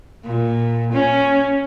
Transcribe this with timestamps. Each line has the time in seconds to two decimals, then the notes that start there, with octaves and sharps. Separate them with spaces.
0.25 A#2
0.93 C#4